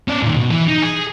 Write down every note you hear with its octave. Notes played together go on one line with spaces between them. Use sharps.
C#4 D5
A#2 D#3
B2
E3
D#4
G#4